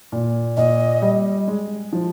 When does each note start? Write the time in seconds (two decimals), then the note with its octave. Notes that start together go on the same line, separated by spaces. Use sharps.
0.12 A#2
0.57 A#2 D#5
1.02 G3
1.47 G#3
1.92 F3